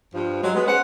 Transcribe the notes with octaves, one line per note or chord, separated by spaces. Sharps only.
G2 F3
F#3 G#3
G#3 B3
C#4 B4 C5 F#5